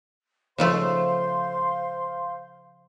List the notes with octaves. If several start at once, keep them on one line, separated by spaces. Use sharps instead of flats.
C#3 F3 A3 C5 F5 C6